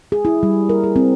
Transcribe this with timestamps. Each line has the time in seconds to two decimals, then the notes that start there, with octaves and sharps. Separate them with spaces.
0.12 G#4
0.25 E4
0.43 G3
0.69 A#4
0.84 G#4
0.96 C4